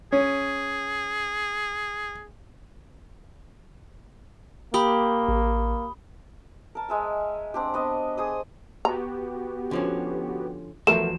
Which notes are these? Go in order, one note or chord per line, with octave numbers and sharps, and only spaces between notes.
C#4 G#4
A#3 G4 B5 D#6 G7
A1
A#4 A5
G#3 E5 G#5
C4 D4 G4
B3 D4 D#5
G#4 C5 C6 D#6
B3 F#4 G4 A#5
D3 F3 C#4
E2 F3 F#3 A3 B3 A#4 E7